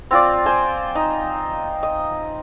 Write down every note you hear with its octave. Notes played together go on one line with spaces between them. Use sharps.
C4 F4 D5
C5 G5 G#5
D#4
D#5